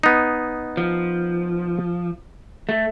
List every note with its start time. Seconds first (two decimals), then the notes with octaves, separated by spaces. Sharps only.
0.03 B3 D#4
0.77 F3
2.69 A3